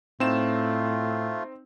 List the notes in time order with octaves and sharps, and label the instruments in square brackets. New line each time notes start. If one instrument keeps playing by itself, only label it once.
[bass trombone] A2 [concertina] A3 F4 [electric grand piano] C4 D#4 E7